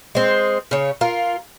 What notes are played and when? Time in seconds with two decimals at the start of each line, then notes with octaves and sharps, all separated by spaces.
0.15 G#3 C4
0.71 C#3 C#5
1.01 F4 A#4